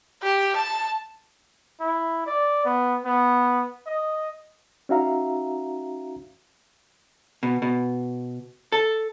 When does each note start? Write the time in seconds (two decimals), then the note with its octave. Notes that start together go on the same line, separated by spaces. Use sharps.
0.23 G4
0.56 A5
1.81 E4
2.27 D5
2.65 B3
3.05 B3
3.87 D#5
4.89 C#4 D#4 F#4 E5 F5 A#5
7.43 B2
7.62 B2
8.72 A4